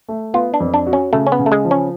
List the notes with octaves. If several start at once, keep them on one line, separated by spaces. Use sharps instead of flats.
A3
B3 F4
D4
F2
D4
F#4
C#4
C#3 A3
C#4
B3
C#3
A3
G#3
F3
C#4